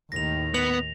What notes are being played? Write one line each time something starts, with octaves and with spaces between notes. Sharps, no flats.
D#2 A2 D#3 A#6 F7
B3 F7